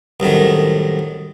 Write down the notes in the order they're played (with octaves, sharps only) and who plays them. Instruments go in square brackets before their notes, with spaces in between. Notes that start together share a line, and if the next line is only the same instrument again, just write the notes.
[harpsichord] C2 F#2 A2 D#3